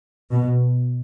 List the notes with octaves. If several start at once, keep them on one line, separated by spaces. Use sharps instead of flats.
B2